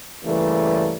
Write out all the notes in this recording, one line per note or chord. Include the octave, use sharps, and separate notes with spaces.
G2 C#3 E3 G3 A3 A#3